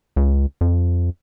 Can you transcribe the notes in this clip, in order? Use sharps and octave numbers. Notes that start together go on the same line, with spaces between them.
C#2
F2